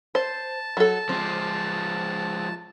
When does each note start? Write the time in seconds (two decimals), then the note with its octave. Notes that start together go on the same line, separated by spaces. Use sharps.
0.15 C5 A5
0.77 F#3 A4
1.09 F3 G#3 C4